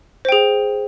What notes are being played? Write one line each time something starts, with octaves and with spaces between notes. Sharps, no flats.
G#4 C5 G5